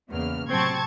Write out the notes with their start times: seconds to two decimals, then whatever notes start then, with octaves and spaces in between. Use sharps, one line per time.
0.10 E2 C#3 A#3 F6
0.49 A2 C3 F#3 C4 A5 C#6 G#6